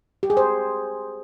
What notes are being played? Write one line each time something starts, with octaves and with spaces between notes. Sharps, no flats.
G4
G#4
C5